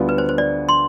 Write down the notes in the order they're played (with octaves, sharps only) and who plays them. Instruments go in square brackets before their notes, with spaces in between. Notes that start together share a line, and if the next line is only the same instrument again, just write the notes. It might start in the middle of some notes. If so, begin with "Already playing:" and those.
Already playing: [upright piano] D2 D3 G3 B3 F4
[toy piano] B4
C5
C5
D5
C6